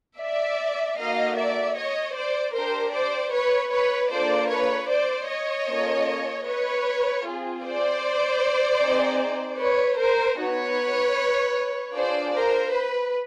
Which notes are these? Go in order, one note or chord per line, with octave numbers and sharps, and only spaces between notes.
D5 E5
A#3 D#4 F#4 A4 D#5 F5
D5 E5
C#5 D#5
C5 D5
D4 G4 A#4 C5
C5 D5
B4 C#5
B4 C#5
A#3 D4 F4 A4 C5 D5
B4 C#5
C5 D5
C#5 D#5
A#3 C#4 F4 A4
B4 C#5
C4 F4 G#4
C5 D5
C4 D#4 G#4
B4 C#5
A#4 C5
B3 D#4 F#4 B4 C#5
D4 F4 G#4 C5 D5
A#4 C5
B4